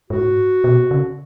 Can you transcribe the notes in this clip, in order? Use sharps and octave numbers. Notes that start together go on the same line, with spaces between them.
G#2 F#4
B2
C#3